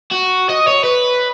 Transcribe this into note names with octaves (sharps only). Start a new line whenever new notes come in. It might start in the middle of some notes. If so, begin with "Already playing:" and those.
F#4
D#5
C#5
B4